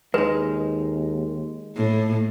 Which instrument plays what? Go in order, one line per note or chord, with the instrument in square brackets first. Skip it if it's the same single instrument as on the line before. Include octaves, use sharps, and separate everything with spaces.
[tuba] D#2 [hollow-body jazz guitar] G#3 D#4 [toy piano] B4
[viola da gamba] A2